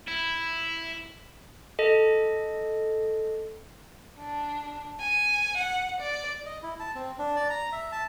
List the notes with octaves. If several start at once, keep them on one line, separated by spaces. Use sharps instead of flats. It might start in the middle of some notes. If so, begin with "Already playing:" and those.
E4
A4 D#5
D4
G#5
F#5
D5
D#5
E4
A5
C4
D4
D5
A#5
E5
A5